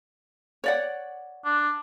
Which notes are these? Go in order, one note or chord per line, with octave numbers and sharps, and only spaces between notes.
C#5 D5 F#5
D4